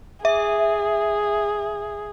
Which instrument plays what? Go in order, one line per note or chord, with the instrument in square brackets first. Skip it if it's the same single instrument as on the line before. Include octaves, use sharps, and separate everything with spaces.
[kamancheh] G#4 [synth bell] E5